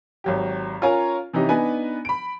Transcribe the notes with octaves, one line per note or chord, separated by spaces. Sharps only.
G#1 F#3 G4
C#4 F4 A#4 C#5 G#5 A#5
C3 E3 C#4 D#4 G4
B3 D4 D#4 B4 G#5
B5 D7